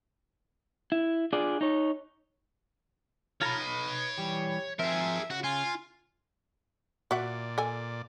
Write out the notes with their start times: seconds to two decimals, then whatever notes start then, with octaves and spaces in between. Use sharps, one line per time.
0.92 E4
1.33 D4 F4 G#4 D5
1.61 D#4 C#5
3.41 F4 A4 C#5 A#5 B5
3.60 B4 D#5
4.18 E3 G3 G4
4.79 F3 C4 G#4 A#4 E5
5.30 C#3 F#4
5.44 F4 G#5
7.11 A#2 F#4 D5 E5 F#5
7.58 A4 G#5